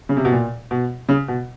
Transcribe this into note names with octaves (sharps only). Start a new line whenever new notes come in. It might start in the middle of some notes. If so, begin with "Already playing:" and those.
C#3
C3
B2
A#2
B2
C#3
B2